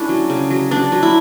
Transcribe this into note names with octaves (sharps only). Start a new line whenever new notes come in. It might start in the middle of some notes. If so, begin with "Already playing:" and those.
Already playing: A3 C#4 D4 E4
F#3
C#3
F#3
F#3 D4
F#3
E4